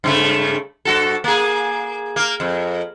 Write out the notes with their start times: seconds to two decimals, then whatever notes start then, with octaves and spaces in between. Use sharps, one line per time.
0.04 G2 C#3 A3
0.85 G2 F#4 A4
1.24 A#3 G#4
2.16 A#3 A#4
2.40 F2